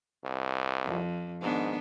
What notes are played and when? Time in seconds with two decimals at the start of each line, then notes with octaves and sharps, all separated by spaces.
0.24 C2
0.85 F2
1.41 G#2 D#3 B3 D4